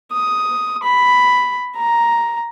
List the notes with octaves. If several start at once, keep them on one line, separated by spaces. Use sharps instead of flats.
D#6
B5
A#5